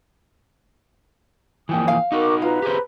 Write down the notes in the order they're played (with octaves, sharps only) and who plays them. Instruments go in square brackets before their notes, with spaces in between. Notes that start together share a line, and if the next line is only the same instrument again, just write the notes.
[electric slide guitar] E3 F3 A#3 [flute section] G5 G#5 D#6
[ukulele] F5
[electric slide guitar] D#4 F#4 [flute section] A#4 C#6 D6
[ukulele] F4 [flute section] B4 A#5 B5
[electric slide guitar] G4 G#4 C5